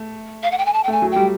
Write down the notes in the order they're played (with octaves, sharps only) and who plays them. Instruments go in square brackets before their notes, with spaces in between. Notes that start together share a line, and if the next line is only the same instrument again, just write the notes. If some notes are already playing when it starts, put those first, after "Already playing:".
Already playing: [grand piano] A3
[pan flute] F5
F#5
G5
G#5
A5
G5
[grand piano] A3 [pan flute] G#5
[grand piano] F#3
[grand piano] G3 [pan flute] G5